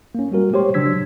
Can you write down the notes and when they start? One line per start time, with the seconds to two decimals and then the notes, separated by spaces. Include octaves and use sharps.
0.15 A#3 C#4
0.31 G3 A#3 F#4 A#4
0.53 G#3 G4 C5 C#5 C6
0.74 C#3 F#3 D4 E6 G#6 B6